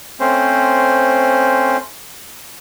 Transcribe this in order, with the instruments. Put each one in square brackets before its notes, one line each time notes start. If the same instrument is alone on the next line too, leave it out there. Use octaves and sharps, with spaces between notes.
[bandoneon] A3 C4 C#4 C5